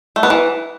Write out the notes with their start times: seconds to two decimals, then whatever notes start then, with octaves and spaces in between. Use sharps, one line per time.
0.16 A3
0.23 B3
0.30 E3